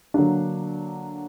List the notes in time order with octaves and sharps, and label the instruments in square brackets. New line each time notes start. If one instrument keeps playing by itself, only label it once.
[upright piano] D3 F#3 A#3 D4